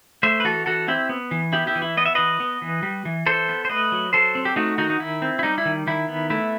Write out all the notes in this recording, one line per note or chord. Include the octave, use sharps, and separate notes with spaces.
A3 C5 E5
B4
E3 F#4 A4
E3 F#4 A4
C4 E4 G4
B3
E3
B3 E4 G4
E4 G4
E3
E4
B3 D#5
E5
E3 B4 D#5
B3
E3
G3
E3
E3 A4 C5
B3
C5
A3 B4 D#5
F#3
F#3 A4 C5
C4
G4
A3 D#4 F#4
D#3 D#4 F#4
D#4
D#3 E4
C4
E4
G3 D#4
E4
D#3
D#3 E4
B3
A3 E4